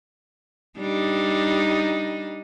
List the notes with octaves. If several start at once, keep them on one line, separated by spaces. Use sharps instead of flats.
G3 D4 D#4